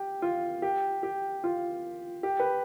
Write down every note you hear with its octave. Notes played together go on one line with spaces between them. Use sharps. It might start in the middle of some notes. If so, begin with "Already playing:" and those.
Already playing: G4
F4
G4
G4
F4
G4
B4